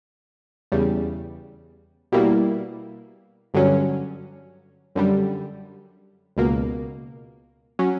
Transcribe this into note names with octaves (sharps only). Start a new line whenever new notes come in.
E2 C#3 G3
B2 G3 A#3 E4
G2 D3 F#3 C#4
F#2 D3 G3
C#2 B2 A#3
F#3 C#4